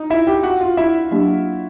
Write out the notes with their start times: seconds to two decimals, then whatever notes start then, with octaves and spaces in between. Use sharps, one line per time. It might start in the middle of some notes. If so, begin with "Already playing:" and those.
Already playing: D#4
0.10 E4 E5
0.27 G4 G5
0.43 F#4 F#5
0.61 F4 F5
0.77 E4 E5
1.11 F#3 A#3 D4 G4